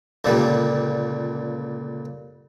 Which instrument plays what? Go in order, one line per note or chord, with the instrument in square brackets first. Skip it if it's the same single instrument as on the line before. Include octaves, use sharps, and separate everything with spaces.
[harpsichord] C#2 A#2 D3 G3